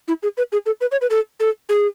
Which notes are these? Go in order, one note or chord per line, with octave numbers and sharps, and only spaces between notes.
E4
G#4
B4
G#4
A4
B4
C#5
B4
A4
A4
G#4